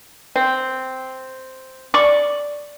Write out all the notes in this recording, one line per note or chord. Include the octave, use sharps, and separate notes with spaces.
C4
D5 C#6